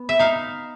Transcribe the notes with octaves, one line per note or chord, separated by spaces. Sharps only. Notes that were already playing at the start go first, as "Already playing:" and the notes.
Already playing: B3
E5
D#4 F5